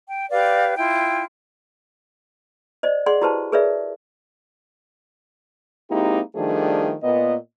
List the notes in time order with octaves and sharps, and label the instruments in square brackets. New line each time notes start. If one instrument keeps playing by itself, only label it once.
[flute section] G5
G4 B4 D5 F5
E4 F4 G5
[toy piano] C5 D5 D#5
G#4 D5 F#5 C6
E4 F#4 G4 B4 C5 A5
G#4 A#4 B4 C#5 D5 E5
[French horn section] G#3 A#3 C4 D#4 E4 G4
D#3 F3 G3 A3 D4 G#4
A#2 B3 D#5